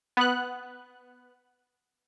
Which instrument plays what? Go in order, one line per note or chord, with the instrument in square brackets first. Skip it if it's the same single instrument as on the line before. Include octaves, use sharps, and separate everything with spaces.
[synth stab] B3 F#6